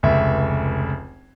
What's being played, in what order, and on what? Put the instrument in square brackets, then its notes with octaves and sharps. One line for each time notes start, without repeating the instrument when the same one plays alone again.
[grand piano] F1 C#2 E5